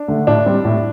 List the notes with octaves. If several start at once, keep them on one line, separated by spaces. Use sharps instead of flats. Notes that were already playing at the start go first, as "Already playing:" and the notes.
Already playing: D4
D3 A3
A2 D4
G3 C4
A2